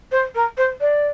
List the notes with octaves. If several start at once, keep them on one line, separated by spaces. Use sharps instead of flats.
C5
A#4
C5
D5